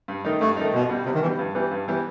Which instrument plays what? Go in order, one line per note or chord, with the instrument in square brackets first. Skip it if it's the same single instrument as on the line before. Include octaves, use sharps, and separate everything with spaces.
[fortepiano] G2
D#3 A3 D#4
[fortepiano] G2 [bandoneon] A3
[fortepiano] D#3 A3 D#4
[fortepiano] C2 [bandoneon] B2
[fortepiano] B2 G3
[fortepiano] C2 [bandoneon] C3
[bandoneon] D#3
[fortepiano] B2 G3 [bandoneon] E3
[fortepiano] G2
E3 G3 B3 E4
G2
E3 G3 B3 E4